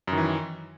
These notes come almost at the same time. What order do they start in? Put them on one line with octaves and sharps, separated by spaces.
F#2 D#3 E3